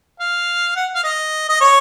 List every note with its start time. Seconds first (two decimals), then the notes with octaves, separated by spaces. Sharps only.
0.20 F5
0.76 F#5
0.95 F5
1.04 D#5
1.49 D#5
1.61 C#5